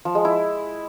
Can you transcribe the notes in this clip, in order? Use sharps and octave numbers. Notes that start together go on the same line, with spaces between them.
F3
G#3
E4